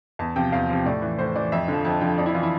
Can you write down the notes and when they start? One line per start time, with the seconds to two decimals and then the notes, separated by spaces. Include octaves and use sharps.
0.19 E2 A5
0.36 C3 F3 G5
0.52 E2 F5
0.69 C3 F3
0.85 A2 D5
1.02 E3
1.18 A2 C5
1.35 E3 D5
1.52 F2 E5
1.68 D3 F3
1.85 F2 A5
2.01 D3 F3 G5
2.18 F2 D5
2.26 E4
2.34 E3 F4
2.43 E4